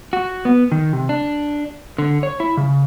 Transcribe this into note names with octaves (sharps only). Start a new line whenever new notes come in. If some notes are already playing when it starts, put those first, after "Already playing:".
F#4
B3
D#3
C3
D4
D3
C#5
E4
C#3